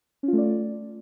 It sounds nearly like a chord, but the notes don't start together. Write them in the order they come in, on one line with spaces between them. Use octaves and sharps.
C#4 F4 A3 D5